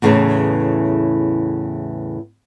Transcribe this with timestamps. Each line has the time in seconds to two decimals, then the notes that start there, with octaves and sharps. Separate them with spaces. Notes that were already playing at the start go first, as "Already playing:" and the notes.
0.02 E2 A2 C#3 E3 G#4